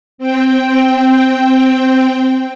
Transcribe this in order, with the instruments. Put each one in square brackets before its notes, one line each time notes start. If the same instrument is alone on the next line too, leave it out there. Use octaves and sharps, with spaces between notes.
[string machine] C4 G5